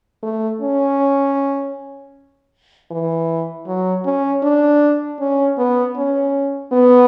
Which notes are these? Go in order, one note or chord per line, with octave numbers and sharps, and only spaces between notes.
A3
C#4
E3
F#3
C#4
D4
C#4
B3
C#4
B3